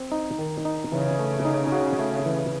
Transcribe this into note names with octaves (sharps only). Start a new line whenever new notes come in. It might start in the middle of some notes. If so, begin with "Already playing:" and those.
Already playing: C4
D#4
D#3
D#4
C#3 E3
A3
D#4
F#4
A3
E3